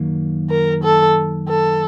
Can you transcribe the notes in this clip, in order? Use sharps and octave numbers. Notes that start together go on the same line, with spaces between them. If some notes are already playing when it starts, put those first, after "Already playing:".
Already playing: F#2 D#3 F#3 A#3
A#4
A4
A4